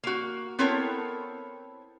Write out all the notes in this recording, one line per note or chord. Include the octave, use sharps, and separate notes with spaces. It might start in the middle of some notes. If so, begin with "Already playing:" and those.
A#3 F#4
B3 C4 E4 A4 A#4 C#5